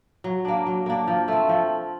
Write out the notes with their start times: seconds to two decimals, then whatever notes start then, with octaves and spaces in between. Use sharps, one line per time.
0.24 F#3
0.45 A#3 D4
0.67 F#3
0.86 A#3 D4
1.07 F3
1.28 A3 C4
1.49 F3